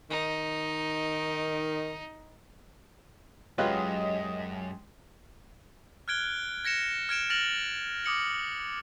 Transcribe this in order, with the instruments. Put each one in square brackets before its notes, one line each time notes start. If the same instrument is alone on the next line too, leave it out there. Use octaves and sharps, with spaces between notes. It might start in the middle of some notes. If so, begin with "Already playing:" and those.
[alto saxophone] D#3 [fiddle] D#4
[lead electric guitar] F#2 [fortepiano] F#3 F4 B4 [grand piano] G#3 G4 G5 [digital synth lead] D#5
[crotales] F6 F#6 G#6 D7 G7
G#6 A#6 C#7 E7
F6 G#6 D7 E7
F6 A6 A#6 D7 F7 F#7
D6 D#6 C#7 F#7